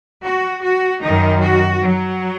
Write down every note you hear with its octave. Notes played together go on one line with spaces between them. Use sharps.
F#4
F#4
F#2 D#3 D#4
F#4
F#3